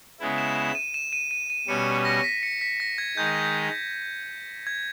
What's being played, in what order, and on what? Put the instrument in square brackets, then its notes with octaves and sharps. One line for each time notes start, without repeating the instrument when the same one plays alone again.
[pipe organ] C#3 G#3 B3 E4
[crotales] E7
E7
D#7
E7
D#7
D#7
D#7
[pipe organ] B2 G3 C#4 [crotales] C#7
[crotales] A#6
B6
C#7
B6
A#6
G#6
[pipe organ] D#3 G#3 D#4 [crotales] G6
[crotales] G#6